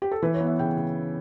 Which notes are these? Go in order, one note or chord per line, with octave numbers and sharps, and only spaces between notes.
G4
A4
E3 B4
C#5
B3
E5
C#3 G5
C#3